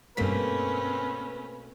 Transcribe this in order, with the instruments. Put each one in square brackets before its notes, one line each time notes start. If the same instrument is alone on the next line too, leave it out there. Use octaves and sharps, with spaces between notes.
[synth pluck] G2 B6 [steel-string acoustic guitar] B2 A3 A#3 [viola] C4 C#4 [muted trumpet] B4